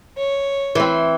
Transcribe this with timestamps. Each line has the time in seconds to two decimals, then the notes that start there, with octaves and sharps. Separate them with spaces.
0.17 C#5
0.75 E3 C4